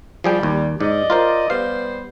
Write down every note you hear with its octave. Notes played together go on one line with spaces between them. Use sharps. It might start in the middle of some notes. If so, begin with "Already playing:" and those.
F3 G3 G#4 G5
D#2
G#2 D5 D#5
F4 A#4 C5
G3 B3 C5 F5